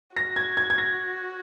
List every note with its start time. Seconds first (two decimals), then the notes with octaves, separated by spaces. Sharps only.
0.16 F#4 A#6
0.36 G#6
0.57 G#6
0.70 G#6
0.78 A#6